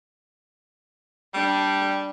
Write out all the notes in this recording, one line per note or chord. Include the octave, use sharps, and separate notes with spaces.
G3 D4 D5